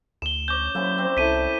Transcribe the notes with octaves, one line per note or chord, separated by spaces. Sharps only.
D2 E6 E7 G7
C#4 D6 G6
D3 F#3 A#3 C#4 E4 C5
C4
C2 E4 A4 E5 B6 D#7
D5 G5